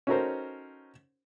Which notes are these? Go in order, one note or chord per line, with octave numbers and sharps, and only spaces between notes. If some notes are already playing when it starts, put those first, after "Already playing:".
C#4 D#4 F#4 A4 A#4 C5